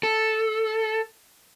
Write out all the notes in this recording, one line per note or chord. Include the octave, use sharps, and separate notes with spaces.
A4